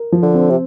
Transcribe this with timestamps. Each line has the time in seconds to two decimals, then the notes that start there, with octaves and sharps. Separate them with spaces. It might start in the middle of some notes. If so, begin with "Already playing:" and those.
Already playing: A#4
0.12 F3
0.23 D3
0.34 C4
0.50 C3